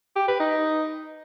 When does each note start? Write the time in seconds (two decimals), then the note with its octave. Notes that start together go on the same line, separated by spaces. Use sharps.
0.16 G4
0.28 B4
0.40 D#4